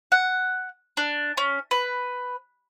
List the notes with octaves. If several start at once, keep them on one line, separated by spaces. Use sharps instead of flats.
F#5
D4
C#4
B4